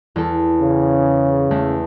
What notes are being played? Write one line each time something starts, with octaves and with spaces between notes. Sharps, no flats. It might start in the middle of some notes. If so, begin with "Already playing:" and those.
E2 A4
C#3
E2 A3 E4